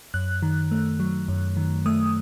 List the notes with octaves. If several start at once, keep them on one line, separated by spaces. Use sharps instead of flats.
F#2 F#6
D#3
A3
F#3
F#2
D#3
A3 D#6